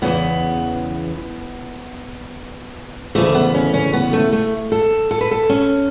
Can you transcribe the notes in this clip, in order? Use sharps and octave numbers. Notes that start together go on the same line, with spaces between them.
E2 C#3 E3 B3
D2 C#3 E3 A3
B3
C#4
C#4
B3
A3
A3
A4
A4
B4
A4
C#4